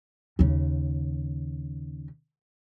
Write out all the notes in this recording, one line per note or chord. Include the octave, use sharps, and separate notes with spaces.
D#2 C#3